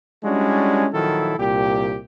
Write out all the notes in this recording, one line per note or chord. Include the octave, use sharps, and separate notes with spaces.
G3 G#3 C#4 D4 E4 F#4
A#2 D#3 F3 F#3 E4 A4
C2 A#2 G4